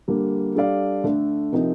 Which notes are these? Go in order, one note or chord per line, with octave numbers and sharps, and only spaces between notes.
D3 G3 A#3
G3 D4 A4 D5 F5
D3 A3 D4
C3 F3 C4 D#4 A#4